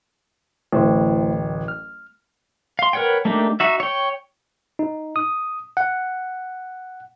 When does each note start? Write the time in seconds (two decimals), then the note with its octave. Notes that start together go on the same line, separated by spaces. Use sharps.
0.72 D1 A1 A3 E4 C5
1.68 F6
2.79 F5 C6
2.93 A#4 B4 C#5 F#5 G5
3.25 A3 A#3 D4 D#4 G4
3.60 D#4 F#4 E5
3.80 C#5 G5
4.79 D#4
5.16 D#6
5.77 F#5